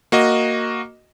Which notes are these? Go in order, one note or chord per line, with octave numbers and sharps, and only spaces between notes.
A#3 F#4 D#5